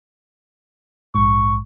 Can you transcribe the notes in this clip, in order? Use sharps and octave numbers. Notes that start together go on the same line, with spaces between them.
A#1 G#2 C#6